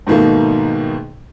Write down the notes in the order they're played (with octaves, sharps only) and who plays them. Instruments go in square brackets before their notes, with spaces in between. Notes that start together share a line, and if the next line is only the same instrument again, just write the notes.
[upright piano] G#2 B2 D#3 A3 A#3